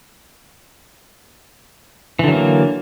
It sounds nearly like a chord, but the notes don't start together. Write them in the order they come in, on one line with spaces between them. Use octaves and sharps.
E3 D3 F#3 A#3